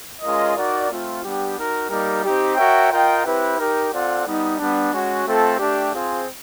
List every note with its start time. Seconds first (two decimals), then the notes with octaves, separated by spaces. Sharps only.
0.22 G#3 C#4 F4 A#4 D#5
0.55 D#4 F#4 A#4 D5
0.89 A3 C4 F4
1.23 G3 B3 D4 G4
1.56 D#4 F#4 A#4
1.89 G3 A#3 D#4 G4 A#4
2.24 C4 D#4 G4
2.56 F#4 A#4 C#5 E5 G5
2.90 F4 A#4 D#5 G5
3.24 C4 E4 G4 B4
3.57 D#4 G4 A#4
3.90 C4 F4 A4 D5 F#5
4.25 G3 B3 D#4
4.58 G3 B3 D4
4.91 G#3 C#4 F#4
5.25 A3 C4 F4 A4
5.58 A3 D4 G4
5.92 C4 F4 G#4 C5